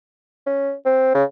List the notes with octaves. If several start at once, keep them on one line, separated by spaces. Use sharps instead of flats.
C#4
C4
C#3